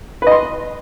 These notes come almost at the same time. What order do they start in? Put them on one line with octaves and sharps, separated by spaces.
B4 D#5 C6